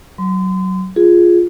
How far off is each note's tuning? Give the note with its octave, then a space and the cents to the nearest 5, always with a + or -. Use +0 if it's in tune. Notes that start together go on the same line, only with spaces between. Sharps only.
F#3 +15 C6 -35
F4 +0 G#4 +0